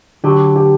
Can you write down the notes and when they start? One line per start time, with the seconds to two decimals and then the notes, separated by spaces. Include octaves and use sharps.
0.24 D3 F#3 G4
0.56 G4